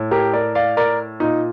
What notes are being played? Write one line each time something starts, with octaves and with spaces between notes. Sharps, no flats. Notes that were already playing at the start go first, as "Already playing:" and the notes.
Already playing: A2
G4 A#4
A#4 D5
D5 F5
A#4 D5
A#2 D#4